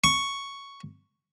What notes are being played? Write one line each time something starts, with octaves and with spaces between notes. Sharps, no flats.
C#6